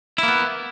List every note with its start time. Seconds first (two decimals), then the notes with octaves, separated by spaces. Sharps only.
0.18 E4
0.23 A#3
0.28 B3